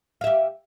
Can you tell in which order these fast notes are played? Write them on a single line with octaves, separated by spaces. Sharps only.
F5 E5 G4